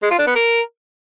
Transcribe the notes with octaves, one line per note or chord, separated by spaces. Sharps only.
G#3
F4
D4
B3
A#4